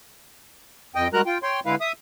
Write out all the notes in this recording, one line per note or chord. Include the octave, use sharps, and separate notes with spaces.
F2 D#5 G5
G3 G#3 F#4 A#4 A#5 F#6
F4 G5
C#5 G5 C6
D3 G#3 E4 B4 F5
E5 D#6